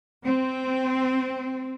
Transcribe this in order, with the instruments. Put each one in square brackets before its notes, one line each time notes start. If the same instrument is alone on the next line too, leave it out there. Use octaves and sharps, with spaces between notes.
[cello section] C4